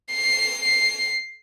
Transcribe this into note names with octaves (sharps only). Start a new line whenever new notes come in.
C7